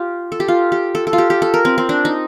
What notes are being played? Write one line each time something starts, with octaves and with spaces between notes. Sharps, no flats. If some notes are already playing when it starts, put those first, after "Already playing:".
Already playing: F4 G4
A4
G4
F4
G4
A4
A4
F4
G4
G4
A4
A#4
C4
C4
D4
D#4